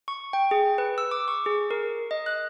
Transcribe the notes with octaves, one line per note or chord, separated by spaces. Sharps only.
C#6
G5
G#4
B4
E6
D6
C#6
G#4
A#4
D#5
F#6